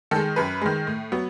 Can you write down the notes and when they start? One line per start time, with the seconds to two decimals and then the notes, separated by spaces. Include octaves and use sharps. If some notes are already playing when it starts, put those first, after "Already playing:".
0.11 D#3 G#3 A4
0.36 F#2 B4
0.61 D#3 G#3
0.87 A2
1.12 F#3 B3